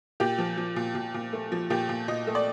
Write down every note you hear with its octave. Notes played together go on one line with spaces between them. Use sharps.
A#2 G4
F3
F3
A#2
A#2
A#2
A3
F3
A#2 G4
A#2
A#2 D#5
A3
D5